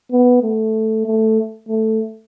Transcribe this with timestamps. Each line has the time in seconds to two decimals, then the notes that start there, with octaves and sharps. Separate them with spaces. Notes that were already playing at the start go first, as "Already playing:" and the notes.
0.12 B3
0.43 A3
1.06 A3
1.69 A3